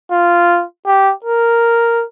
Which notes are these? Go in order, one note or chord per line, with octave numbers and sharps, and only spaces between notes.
F4
G4
A#4